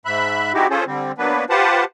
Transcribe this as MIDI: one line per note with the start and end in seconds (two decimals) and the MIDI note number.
0.06 0.52 44
0.06 0.52 76
0.06 0.52 83
0.06 0.52 90
0.54 0.67 56
0.54 0.67 60
0.54 0.67 63
0.54 0.67 64
0.54 0.67 66
0.54 0.67 67
0.70 0.84 61
0.70 0.84 65
0.70 0.84 68
0.70 0.84 69
0.70 0.84 72
0.87 1.12 50
0.87 1.12 55
0.87 1.12 60
1.18 1.45 54
1.18 1.45 58
1.18 1.45 59
1.18 1.45 62
1.18 1.45 71
1.50 1.84 65
1.50 1.84 67
1.50 1.84 71
1.50 1.84 72
1.50 1.84 78
1.50 1.84 81